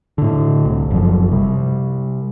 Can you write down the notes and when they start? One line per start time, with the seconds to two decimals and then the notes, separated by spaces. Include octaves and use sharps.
0.18 A2 D3
0.65 C2
0.90 F#1 F#2 F3
1.32 C3 G3